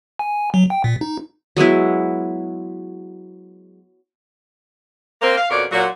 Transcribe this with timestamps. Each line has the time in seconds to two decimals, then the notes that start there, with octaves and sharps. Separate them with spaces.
0.19 G#5
0.54 F#3
0.70 G5
0.84 A#2
1.01 D#4
1.57 F#3 G#3 B3 E4
5.22 A#3 C4
5.37 F5
5.50 F2 B2 C#4 A#4 C#5 D5
5.71 A#2 F#3 F#4